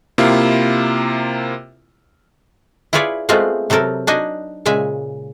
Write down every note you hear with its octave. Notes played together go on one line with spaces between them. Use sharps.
C3 A#3 E4 F4
E4 F4 G#4 B4 C#5 D5
G#3 A3 B3 C4 F4 F#4
C3 F#3 C4 A4 A#4
D4 D#4 F#4 D#5 G#5
A#2 C#3 G#3 E5 G#5